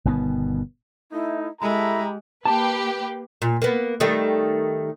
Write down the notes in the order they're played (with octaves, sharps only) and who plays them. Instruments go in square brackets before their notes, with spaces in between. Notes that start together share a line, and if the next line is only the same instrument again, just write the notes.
[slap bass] G1 B2 D#3 B3
[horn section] A3 D#4 [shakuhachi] E4
[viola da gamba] G#3 [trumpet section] E4 A#5 B5 [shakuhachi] G4 [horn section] A4
[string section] A#3 G4 B4 [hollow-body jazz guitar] A5
[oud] A#2
A#3 B3
D#3 G3 A3